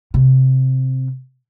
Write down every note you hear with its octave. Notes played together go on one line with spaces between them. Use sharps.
C3